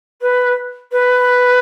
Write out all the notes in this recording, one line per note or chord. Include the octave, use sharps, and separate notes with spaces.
B4
B4